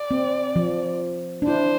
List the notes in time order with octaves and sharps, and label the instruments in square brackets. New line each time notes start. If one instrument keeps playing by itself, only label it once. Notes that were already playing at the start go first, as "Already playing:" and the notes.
Already playing: [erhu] D5
[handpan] C4
F3
D4
[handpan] E4 [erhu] C5